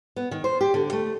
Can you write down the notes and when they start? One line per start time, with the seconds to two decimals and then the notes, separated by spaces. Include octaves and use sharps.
0.16 B3
0.31 D#3
0.44 C5
0.61 G4
0.74 D3
0.93 A3